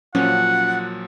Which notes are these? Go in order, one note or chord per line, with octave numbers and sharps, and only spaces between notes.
A#2 F3 F#3 C#4 F#5